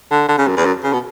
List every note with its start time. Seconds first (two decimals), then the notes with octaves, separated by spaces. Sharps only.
0.11 D3
0.29 D3
0.38 C#3
0.47 F#2
0.56 E2
0.65 F#2
0.83 C#3
0.93 B2